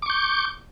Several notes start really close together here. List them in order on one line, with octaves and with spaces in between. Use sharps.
D6 C#6 G6